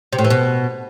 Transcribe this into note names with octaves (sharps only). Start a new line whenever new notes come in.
C3
A2
E3
B2